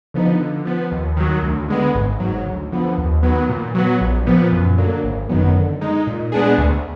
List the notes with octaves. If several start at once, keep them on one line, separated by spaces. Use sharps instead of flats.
D3 F3 B3 D#4
D3
F3 B3
D#2
D#3 F#3
D2
D3 G#3 B3
G#1
G#2 F#3
D2
D3 F3 B3
D#2
D#3 F#3 B3
A#2
F#3 B3
A#1
A#2 F3 B3
F#2
D3 F#3 A#3
G#1
F#2 D#3 F#3 B3
D3
G#3 D#4
A#2
G#3 B3 D4 G#4
D2